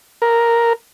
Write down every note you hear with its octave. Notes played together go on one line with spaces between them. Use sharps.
A#4